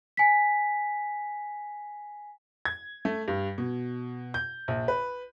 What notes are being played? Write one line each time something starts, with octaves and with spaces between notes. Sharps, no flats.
G#5 B6
G#6
A3
G2
B2
G6
A#1
B4